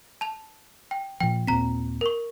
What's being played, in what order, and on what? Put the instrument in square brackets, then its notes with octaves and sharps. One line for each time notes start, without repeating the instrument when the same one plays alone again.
[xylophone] A5 F7
G5
[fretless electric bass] A#2 F3 [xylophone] G5
[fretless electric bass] D#2 A#2 C4 [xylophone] A#5 B6
[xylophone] A#4 C#6